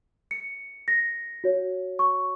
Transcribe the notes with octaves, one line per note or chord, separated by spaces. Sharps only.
C#7
A#6
F#4 C#5
C#6